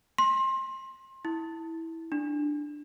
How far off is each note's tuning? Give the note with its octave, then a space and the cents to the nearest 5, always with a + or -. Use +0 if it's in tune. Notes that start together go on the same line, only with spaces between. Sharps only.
C6 +25
E4 -15
D4 +5